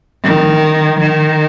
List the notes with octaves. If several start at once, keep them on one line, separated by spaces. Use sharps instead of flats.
D#3
D#3